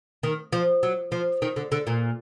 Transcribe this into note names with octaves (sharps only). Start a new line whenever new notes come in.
D#3
F3
F#3
F3
D#3
D3
D3
A#2